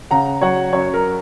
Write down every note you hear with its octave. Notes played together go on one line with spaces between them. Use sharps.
C#3 F#5 A#5
F#3 C#5 F#5
F#2 C#5
A#4